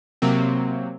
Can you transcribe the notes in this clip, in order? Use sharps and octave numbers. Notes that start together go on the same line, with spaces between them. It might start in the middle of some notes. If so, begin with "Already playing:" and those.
C3 F#3 A#3 C4